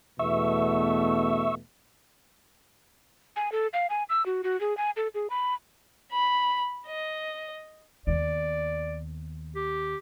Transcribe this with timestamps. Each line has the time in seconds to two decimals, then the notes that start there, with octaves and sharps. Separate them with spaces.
0.19 E2 B2 A3 E5 C#6 E6
3.36 G#5
3.52 A4
3.73 F5
3.90 G#5
4.10 E6
4.26 F#4
4.44 F#4
4.61 G#4
4.77 G#5
4.97 A4
5.15 G#4
5.30 B5
6.12 B5
6.86 D#5
8.07 D#2 B3 D5
9.55 G4